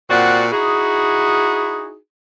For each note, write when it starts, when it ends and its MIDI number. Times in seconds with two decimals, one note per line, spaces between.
0.10 0.47 46
0.10 0.47 60
0.10 0.47 66
0.10 0.47 74
0.10 0.47 78
0.52 1.96 63
0.52 1.96 64
0.52 1.96 66
0.52 1.96 68